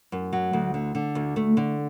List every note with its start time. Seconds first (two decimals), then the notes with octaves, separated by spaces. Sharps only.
0.12 F#2
0.33 F#3
0.53 D2
0.74 D3
0.95 D3
1.15 D2
1.36 A3
1.57 D3